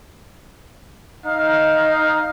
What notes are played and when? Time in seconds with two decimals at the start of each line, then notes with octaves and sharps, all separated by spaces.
1.26 D#4 F5